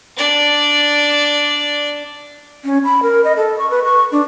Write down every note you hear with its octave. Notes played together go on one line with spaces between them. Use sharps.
D4 D5
C#4
B5
A#4
D#5
A4
C#6
B4
C#6
D4